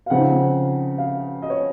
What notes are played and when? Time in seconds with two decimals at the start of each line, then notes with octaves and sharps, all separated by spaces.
0.06 F5
0.10 C#3 F3 C4 D#4 F#5
0.98 F5
1.42 D#5
1.50 C#5